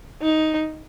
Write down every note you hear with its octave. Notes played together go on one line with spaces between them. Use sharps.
D#4